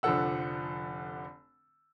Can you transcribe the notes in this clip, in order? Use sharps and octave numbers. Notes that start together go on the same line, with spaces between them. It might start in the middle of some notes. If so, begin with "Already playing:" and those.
F1 D3 F3 A4 F#5 E6